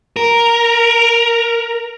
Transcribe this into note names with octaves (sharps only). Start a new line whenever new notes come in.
A#4